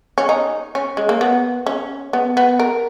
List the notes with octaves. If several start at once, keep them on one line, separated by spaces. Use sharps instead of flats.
C#4
D#4
C#4
G#3
A#3
B3
C#4
B3
B3
A#4